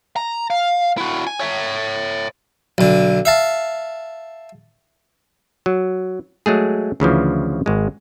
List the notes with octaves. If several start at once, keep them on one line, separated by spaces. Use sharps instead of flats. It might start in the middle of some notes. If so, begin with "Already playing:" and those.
A#5
F5
E4 F#4
G#5
C#5 E5
B1 D3
E5 F5 A5
F#3
F#3 G#3 A3 G#4
D2 C#3 E3 F3
G#1 G#3